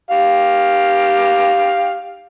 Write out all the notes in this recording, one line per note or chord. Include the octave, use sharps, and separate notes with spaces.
G4 F5